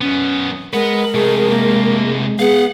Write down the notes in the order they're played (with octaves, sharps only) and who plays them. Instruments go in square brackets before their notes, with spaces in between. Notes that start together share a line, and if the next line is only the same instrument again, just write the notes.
[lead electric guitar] F#2 B3 [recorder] C#4
[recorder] G#3 [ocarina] A#4 [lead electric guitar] B4 F#5
[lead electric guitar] C3 A3 [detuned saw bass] G#3 [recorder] G#4
[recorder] A#3
[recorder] B3 [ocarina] G#4 [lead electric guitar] F5 F#5